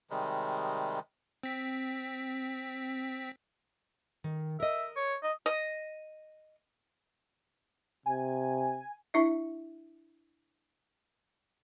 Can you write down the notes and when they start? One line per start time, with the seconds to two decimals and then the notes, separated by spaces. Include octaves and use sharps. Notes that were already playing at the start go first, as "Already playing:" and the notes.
0.10 C3 D#3 G3 G#3
1.43 C4 B6
4.24 D#3
4.60 A#4 D#5 E5
4.97 C#5
5.23 D#5
5.46 D#5
8.06 C3 G#5
9.14 D4 E4 E5